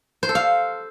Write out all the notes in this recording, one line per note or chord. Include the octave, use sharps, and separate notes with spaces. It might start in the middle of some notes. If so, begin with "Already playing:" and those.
C5
A4
F5